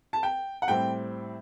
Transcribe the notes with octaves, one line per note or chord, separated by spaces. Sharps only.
A5
G5
F#5
A2 G3 C4 G5